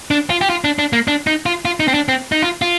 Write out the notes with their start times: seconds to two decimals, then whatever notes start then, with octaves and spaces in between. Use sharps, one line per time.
0.11 D4
0.30 F4
0.41 G4
0.50 F4
0.64 D4
0.79 D4
0.93 A#3
1.08 D4
1.27 D#4
1.46 F4
1.65 F4
1.80 D#4
1.88 C4
1.94 D4
2.08 C4
2.32 D#4
2.42 F4
2.62 F4